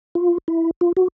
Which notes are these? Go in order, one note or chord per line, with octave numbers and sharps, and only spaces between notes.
F4
E4
F4
F#4